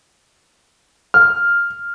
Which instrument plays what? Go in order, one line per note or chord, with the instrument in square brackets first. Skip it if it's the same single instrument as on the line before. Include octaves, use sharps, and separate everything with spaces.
[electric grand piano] F6